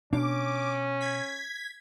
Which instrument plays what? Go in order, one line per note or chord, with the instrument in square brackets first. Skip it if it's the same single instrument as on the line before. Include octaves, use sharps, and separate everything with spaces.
[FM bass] B2 [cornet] C#4 [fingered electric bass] D4 [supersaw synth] D6
[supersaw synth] G#6 B6